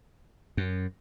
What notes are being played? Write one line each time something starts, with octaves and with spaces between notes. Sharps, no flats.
F#2